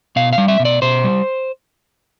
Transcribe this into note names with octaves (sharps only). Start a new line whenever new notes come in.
B2 F5
F5
G3
E5
B2
D5
B2 C5
G3